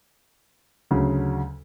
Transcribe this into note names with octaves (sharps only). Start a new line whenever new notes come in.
D2 C#3 F#3